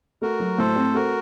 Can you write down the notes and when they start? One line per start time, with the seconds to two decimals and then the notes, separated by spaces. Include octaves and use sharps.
0.22 A3 F#4 A#4
0.40 F#3
0.58 A2 A4 C5
0.76 C4
0.94 A3 F#4 A#4